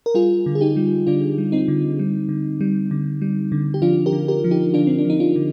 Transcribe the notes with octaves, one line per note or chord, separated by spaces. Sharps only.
A#4
G3 F4 G#4
D3
G#4
D#4 G4
G3
D3 D4 F4
G3
C4 D#4
D3
G3
D3
G3
D3
G3
D3
G4
F3 D4 F4
G4 A#4
D3
G4 A#4
F3
D#4 G4
D3 D4 F4
C4
D4
F3 D#4
D4 F4
D3